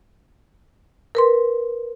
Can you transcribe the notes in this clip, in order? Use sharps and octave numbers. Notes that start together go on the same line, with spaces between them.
A#4 B4 C6